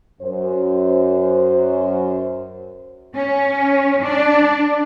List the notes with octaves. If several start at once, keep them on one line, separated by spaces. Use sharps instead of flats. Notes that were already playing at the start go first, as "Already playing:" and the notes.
F#2 C5
C#4
D4